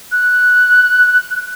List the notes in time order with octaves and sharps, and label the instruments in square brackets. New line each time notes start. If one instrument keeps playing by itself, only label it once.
[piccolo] F#6